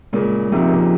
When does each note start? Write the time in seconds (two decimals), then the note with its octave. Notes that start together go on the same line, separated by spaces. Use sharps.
0.13 A#2 C#3 G#3
0.52 G#2 C3 F3
0.67 A#2
0.75 C3